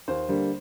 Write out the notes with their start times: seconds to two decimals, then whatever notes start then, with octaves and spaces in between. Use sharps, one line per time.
0.08 D#2 C5
0.29 D3 G3 A#3